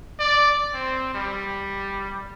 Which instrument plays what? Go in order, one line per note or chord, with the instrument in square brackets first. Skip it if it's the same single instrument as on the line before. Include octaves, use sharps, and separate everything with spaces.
[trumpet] D5
C4
G3